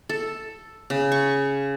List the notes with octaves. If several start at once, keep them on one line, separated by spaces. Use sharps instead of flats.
A4
C#3
C#6